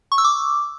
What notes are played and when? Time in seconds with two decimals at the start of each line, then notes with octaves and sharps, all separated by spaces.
0.12 C#6
0.18 E6
0.24 D6